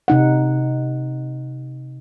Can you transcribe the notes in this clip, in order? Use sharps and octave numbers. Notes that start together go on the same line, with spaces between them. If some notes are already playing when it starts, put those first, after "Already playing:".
C3 D#4 F#5